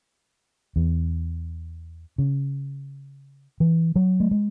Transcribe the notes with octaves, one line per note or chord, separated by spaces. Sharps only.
E2
C#3
E3
F#3
A3
G#3